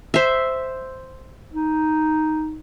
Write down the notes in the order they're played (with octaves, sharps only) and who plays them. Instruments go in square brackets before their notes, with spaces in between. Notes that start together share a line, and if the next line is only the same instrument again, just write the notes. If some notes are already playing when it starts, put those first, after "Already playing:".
[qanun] C5 E5
[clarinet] D#4